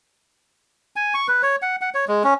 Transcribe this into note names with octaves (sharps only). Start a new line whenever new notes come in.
G#5
C#6
B4
C#5
F#5
F#5
C#5
G#3
C#4